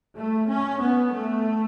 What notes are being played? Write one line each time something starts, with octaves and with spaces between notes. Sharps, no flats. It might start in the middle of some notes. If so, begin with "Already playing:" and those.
A3
C#4
B3
A3